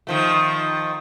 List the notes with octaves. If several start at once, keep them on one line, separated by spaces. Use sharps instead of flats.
D#3 F3 A3